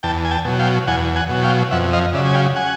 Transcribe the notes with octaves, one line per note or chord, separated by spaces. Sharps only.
E2 G5 A5
G#5
G5 A5
B2 F#3
F5 G5
E2 F#5 G#5
F#5 G#5
B2 F#3
F5 G5
F2 E5 F#5
D#5 F5
C#3 F#3 D5 E5
G#5
F5 G5
F#5 G#5